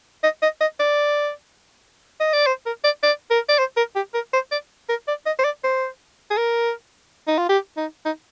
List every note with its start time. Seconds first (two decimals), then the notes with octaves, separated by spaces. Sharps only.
0.23 D#5
0.42 D#5
0.61 D#5
0.79 D5
2.20 D#5
2.33 D5
2.47 C5
2.66 A#4
2.84 D5
3.03 D5
3.30 A#4
3.49 D5
3.58 C5
3.77 A#4
3.95 G4
4.14 A#4
4.33 C5
4.51 D5
4.89 A#4
5.08 D5
5.26 D#5
5.39 C5
5.44 D5
5.64 C5
6.30 G#4
6.37 A#4
7.27 D#4
7.38 F4
7.49 G4
7.77 D#4
8.05 D#4